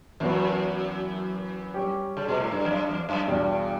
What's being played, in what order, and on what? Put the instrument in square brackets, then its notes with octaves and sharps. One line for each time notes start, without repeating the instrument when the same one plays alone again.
[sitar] F#2 [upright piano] E3 B3 F#4 B4
[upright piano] G3 C#4 G4
[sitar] C#3
B2
A2
G2
E2
F#2
E2
F#2
[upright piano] E2 B2 G3 [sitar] G2